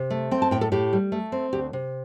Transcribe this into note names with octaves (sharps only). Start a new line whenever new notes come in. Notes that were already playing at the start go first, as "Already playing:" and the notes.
Already playing: C3
A3
C4 G5
A5
A2 G5
A4
A2 G4
G3
A3
C4
D2 G4
C3